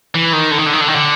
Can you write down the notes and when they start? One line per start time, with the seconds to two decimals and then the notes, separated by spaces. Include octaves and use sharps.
0.15 E3
0.33 D#3
0.51 D3
0.59 D#3
0.66 D3
0.73 D#3
0.80 D3
0.88 D#3
0.95 D3